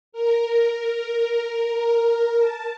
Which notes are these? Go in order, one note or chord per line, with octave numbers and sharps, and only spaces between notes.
A#4
A5